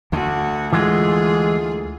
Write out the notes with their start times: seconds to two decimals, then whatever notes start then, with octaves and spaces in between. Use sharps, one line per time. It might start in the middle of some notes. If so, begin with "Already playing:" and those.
0.12 D2 D3 F#4
0.73 E3 G#3 F4 G#4